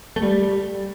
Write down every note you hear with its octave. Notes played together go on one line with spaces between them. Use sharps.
A3
G3